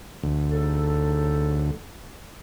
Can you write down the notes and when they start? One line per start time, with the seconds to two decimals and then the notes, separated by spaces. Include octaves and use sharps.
0.23 D2
0.50 C#3 D#4 A4